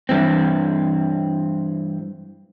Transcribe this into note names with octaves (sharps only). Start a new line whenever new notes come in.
G2 E3 C4